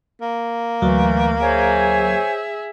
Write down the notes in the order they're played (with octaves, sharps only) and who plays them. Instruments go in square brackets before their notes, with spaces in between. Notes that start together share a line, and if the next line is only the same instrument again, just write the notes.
[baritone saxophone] A#3
[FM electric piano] D2 F#3 [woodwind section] E3 A3
[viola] G#4 E5 [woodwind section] C5 C#5 G#5